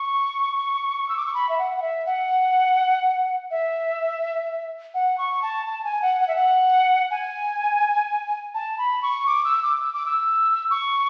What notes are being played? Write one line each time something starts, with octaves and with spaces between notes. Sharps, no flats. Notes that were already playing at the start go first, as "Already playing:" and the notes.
Already playing: C#6
E6
D6
C#6
B5
E5
F#5
F#5
E5
F#5
E5
F#5
C#6
A5
A5
G#5
F#5
F#5
E5
F#5
G#5
A5
B5
C#6
D6
E6
D6
E6
D6
E6
C#6